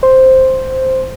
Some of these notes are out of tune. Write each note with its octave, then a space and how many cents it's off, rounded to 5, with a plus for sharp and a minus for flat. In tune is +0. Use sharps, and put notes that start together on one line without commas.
C5 +0